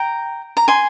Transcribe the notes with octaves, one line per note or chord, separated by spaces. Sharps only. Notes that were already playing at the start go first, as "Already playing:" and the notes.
Already playing: G5 A#5
A#5
G#5 C6